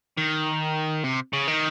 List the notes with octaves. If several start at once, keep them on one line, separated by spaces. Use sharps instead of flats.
D#3
C3
C#3
D#3